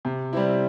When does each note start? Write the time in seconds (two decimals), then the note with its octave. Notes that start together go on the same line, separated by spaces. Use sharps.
0.05 C3
0.33 G3 C4 E4